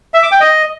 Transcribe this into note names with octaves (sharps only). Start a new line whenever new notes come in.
E5
D6
G5
D#5